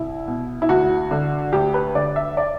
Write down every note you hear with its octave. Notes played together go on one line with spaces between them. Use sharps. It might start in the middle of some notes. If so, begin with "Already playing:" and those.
Already playing: C2 E4
B2
E4
D2 F#4
D3
D2 G4
B4
D3 D5
E5
D5